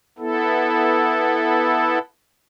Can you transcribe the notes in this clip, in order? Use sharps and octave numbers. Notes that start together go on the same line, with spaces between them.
B3 E4 A4